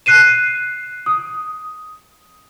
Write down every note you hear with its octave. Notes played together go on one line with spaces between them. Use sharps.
F#6 C7 D#7 E7
D#6